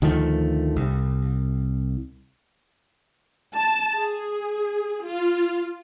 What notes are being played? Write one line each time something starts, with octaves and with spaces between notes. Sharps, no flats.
D2 D#3 F3 A3
C2
A5
G#4
F4